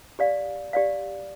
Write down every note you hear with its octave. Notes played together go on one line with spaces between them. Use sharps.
G4 D5 F5
G4 D5 F5